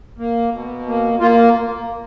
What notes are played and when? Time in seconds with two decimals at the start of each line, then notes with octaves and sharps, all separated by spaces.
0.18 A#3
0.52 B2
0.86 A#3
1.19 A#3 F4